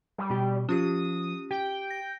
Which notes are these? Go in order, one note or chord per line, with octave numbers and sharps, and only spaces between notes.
G3
B2 G4
F3 C#4 F4 G4 D#6
G4 G5
A#6